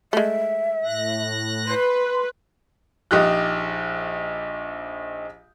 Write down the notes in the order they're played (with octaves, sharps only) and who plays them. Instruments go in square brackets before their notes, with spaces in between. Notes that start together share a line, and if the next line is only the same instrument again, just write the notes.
[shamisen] G#3 A3 [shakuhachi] E5
[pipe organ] A2 F#6 A#6
[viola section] B4 [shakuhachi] C6
[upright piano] A#1 D#4 G4 D#5 F#6